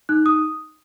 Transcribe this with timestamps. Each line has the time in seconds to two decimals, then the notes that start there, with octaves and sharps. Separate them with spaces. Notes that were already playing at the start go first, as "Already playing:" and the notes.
0.09 D#4 F#6
0.26 D#6